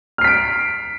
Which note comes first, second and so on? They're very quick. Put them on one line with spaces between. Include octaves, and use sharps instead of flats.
F6 C7 B6 D7